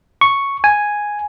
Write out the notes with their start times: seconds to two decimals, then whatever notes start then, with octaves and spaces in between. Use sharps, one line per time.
0.21 C#6
0.64 G#5